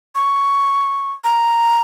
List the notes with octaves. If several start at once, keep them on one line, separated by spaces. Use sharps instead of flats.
C#6
A#5